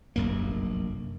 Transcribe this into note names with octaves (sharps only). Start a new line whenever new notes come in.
F1 A#1 F#2 A#3